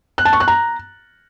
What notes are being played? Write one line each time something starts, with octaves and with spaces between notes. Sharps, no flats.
F#6
A5
C#6
F#6
A#5